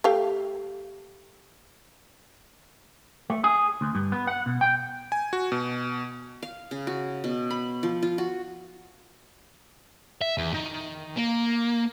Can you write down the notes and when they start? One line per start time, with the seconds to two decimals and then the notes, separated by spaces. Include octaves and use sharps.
0.04 A3 G4 F5
3.30 A3
3.44 G#4
3.81 D2
3.95 G2
4.12 B3
4.27 F#5
4.46 B2
4.61 G5
5.12 G#5
5.33 F#4
5.52 B2
6.43 F5
6.71 C#3
6.87 F#4
7.24 B2
7.51 B5
7.83 F3
8.02 F4
8.18 F#4
10.21 E5
10.38 E2
10.54 D#3
11.17 A#3